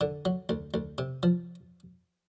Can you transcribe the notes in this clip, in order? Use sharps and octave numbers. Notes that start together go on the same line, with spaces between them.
D3
F#3
D2
D2
C3
F3